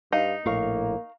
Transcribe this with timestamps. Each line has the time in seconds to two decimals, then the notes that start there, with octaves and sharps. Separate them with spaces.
0.12 G2 D#4 F5
0.46 A#1 A2 A#3 A#4 F5 C#6